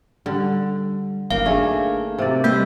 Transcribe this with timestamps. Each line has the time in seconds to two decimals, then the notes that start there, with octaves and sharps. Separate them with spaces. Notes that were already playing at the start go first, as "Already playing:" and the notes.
0.26 D3 G3
1.30 G1 A#3 D#4 F5
1.46 A3 D4 G#4
2.19 C3 D5
2.44 G3 A#3 B4 C5 D#5